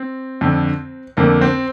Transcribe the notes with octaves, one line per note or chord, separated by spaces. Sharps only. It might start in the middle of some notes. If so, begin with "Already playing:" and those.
Already playing: C4
F2 D3
F2 D3 A#3
C4